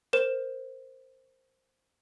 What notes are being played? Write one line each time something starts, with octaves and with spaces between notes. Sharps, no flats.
A#4 C5 E7